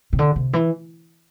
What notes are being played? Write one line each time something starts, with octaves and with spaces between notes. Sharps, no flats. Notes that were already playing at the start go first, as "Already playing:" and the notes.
C3
D3
C3
E3